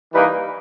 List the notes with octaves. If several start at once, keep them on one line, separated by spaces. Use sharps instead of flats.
E3 G3 A#3 D#4 B4